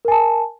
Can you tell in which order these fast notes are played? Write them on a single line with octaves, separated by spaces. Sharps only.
A#4 G#5 A5